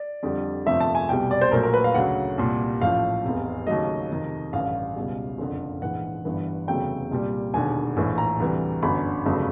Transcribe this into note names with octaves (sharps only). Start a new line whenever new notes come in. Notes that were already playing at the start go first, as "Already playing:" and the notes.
Already playing: D5
F2 D3 G3
G1 F2 C3 F3 A3 E5
A5
G#5
C2 B2 G3 G5
D5
C5
A#1 A#2 F#3 A3 A#4
A#4
B4
F5
D2 C#3 F#3 F#5
C2 A#2 G3
A1 A2 F3 F5
F1 E2 C3
D#2 C#3 F#3 A3 D#5
F2 C3 D#3
A1 G2 D3 F5
C#2 B2 G3
F#1 F2 D3
A#1 G#2 E3 F#5
G1 G2 E3
F1 E2 C#3 F#3 A3 G5
C2 A#2 G3
E1 D#2 D3 G#5
A#1 A2 E3
A#5
D2 C3 E3 G3
G1 F#2 D3 B5
G1 F2 C#3 F#3 A3